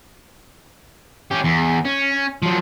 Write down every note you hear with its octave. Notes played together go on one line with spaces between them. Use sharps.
C#4 G4
E2
C#4
F3 F#3